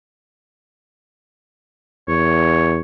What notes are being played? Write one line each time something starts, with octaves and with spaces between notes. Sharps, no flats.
E2 C#5